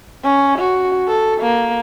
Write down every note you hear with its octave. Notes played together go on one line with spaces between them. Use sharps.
C#4
F#4
A4
A#3